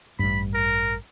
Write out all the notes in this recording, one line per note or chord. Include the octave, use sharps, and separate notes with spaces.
A1 G2 B5
A#4